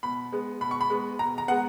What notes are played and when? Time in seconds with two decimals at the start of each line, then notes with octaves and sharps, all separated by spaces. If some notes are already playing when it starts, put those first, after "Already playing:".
0.03 B2 B5
0.32 G#3 B3
0.61 B2 B5
0.71 C#6
0.81 B5
0.90 G#3 B3
1.19 B2 A#5
1.38 A#5
1.48 G#3 B3 F#5